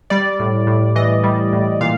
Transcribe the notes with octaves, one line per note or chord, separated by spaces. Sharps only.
G3 D5
A2
A2
E3 D#5
G3
A2
A#2 F5